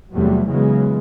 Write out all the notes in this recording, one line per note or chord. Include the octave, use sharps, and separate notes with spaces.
E2 C3 F#3 G3 A3
C#3 E3 F#3 G#3 B3